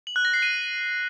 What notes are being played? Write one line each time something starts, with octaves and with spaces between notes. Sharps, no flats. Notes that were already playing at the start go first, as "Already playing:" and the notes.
F#7
F#6
A#6
C7
D#7